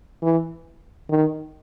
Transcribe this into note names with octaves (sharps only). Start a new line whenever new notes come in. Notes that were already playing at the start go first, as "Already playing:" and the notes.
E3
D#3